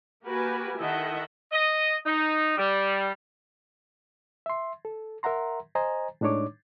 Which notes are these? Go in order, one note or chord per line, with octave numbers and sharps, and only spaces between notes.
A#3 F#4 G4 A#4 B4 G#5
D#3 E4 A4 D#5 E5 F#5
D#5
D#4
G3
E5 C6
A4
A#4 E5 F#5 A#5 C6
C5 D#5 G#5 A#5
A2 G#3 D4 D#4 C#5 D6